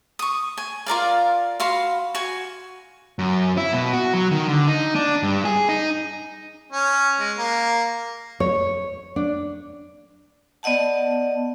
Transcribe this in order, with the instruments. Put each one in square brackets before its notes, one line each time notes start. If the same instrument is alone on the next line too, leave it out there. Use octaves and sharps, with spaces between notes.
[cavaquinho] C#6 D#6
G#5
F4 A#4 D5 F5
F#4 F5 B5 C6
F#4 G#5
[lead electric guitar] F#2
E4
B2
F#4
F#3
D#3
D3
D#4
D4
G2
G#4
D#4
[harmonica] C#4
G#3
A#3
[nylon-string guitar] C#5
D4
[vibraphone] B3 D5 D#5 F#5 A5